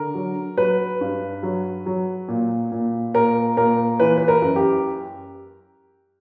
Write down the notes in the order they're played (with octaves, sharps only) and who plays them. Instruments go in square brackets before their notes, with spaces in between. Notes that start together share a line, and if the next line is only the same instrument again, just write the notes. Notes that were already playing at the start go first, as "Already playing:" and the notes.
Already playing: [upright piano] D3 A#4
F#3
F#3 B4
G2
F#3
F#3
A#2
A#2
A#2 A#4
A#2 A#4
E3 B4
B4
A#4
F#2
G4